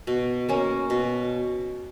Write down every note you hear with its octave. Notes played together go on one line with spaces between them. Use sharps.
B2
A#3 C#4
B2